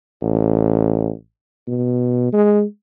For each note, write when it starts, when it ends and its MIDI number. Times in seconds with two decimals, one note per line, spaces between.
0.22 1.10 33
1.68 2.30 47
2.33 2.63 56